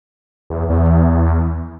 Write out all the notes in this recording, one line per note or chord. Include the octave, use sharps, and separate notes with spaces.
E2
E2